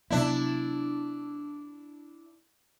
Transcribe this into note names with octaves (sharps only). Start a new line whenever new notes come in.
C3 F#3 B3 D4 E4